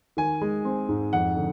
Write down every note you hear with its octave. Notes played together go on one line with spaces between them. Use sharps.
D#3 G#5
G#3
C4
G#2
F2 F#5
D3